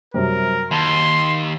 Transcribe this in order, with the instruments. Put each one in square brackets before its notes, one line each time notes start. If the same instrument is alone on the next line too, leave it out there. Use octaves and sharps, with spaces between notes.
[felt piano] F#2 C3 G3 [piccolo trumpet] A#4
[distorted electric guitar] D#2 [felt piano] A5 B5 [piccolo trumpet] C6